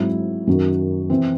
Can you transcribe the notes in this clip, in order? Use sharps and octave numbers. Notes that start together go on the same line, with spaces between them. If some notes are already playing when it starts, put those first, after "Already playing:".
Already playing: G#2 F#3 C4 E4
F#2 D#3 F#3 C#4 F#4
C3 E3 C4